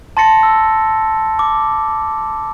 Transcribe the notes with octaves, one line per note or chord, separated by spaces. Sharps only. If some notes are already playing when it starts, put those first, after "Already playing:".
A5 C6 A6 A#6 C#7
E6
D6